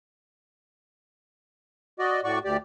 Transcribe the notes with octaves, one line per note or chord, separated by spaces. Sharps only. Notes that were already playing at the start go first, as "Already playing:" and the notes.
F#4 D5 D#5
A2 F#4 D5 C#6
D2 G4 D5